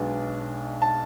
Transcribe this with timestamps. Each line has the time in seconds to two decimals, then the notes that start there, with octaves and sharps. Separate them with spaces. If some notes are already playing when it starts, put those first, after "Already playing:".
Already playing: B1 B2 G#3 B3 D4
0.82 A5